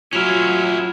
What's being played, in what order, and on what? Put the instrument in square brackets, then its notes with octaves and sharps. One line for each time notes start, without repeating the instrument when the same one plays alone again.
[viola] F#3 [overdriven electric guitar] C#4 E4 [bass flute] F4 [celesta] F6 E7 F7